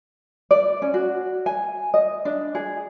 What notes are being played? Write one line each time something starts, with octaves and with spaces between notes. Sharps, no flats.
D5
C#4
F#4
G#5
D#5
D4
G#4